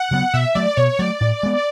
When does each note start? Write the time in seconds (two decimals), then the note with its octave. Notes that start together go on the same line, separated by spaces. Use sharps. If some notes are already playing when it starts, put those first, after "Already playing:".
Already playing: F#5
0.11 C#3 F#3 B3
0.33 B2 E5
0.55 F#3 A3 D5
0.77 B2 C#5
0.99 F#3 A3 D5
1.21 A2
1.43 G#3 B3